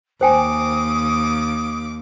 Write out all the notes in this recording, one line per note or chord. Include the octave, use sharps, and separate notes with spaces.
D#2 C5 G5 G#5 D6 D#6